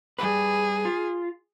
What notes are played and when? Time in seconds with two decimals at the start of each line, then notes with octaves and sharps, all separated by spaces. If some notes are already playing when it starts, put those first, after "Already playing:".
0.19 G3 G#4 B4
0.85 F4